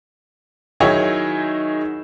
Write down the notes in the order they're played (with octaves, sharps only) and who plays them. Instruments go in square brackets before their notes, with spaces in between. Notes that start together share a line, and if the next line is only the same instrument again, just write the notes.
[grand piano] D#3 F#3 D#4 E4 G#4 C#5